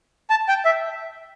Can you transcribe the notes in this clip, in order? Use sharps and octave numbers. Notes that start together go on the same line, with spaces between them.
A5
G5
E5